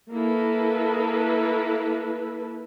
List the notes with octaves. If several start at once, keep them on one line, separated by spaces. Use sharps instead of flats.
A#3 E4 A4 B4